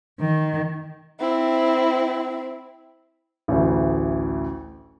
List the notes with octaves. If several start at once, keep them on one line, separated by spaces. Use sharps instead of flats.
D#3
C4 E4
A1 D2